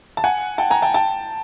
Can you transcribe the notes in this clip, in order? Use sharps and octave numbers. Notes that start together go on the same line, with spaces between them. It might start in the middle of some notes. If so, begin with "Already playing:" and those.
A5
F#5 G#5
G5 A5
G#5 A#5
G5 A5
G5 A5